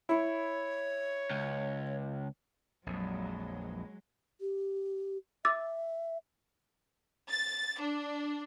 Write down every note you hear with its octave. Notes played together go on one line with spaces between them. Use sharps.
E4 C#5
C#2
A#1 F2 F#3 G#3
G4
E5 D6 E6 A6
A6
D4